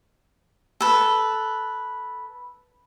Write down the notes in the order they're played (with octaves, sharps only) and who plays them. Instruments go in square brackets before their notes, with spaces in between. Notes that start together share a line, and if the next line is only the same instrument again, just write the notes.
[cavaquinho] A4 B4